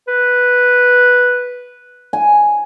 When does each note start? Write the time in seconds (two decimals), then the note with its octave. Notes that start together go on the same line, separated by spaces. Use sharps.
0.08 B4
2.13 G#5